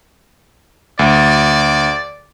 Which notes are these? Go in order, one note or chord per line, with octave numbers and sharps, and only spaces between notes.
D2 D5